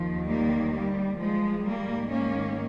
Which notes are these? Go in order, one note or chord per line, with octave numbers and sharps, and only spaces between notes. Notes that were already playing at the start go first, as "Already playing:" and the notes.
Already playing: D#2 D#3 F3
G3 A#3
G3
F3 G#3
G#2 D#3 G3 A#3
A#3 C#4